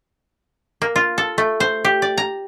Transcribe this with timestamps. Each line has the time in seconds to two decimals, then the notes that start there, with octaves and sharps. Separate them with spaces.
0.82 A#3
0.96 F4
1.18 A4
1.38 A3
1.60 C5
1.85 G4
2.02 D5
2.18 A#5